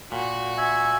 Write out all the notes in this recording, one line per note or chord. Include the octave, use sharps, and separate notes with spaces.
A#2 F#4
E5 G#5